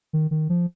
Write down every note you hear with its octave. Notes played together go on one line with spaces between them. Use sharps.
D#3
D#3
F3